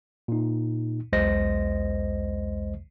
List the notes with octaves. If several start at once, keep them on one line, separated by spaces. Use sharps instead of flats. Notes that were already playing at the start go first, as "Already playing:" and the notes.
A#2 D#4
B1 E2 G#3 C5 D#5 A#6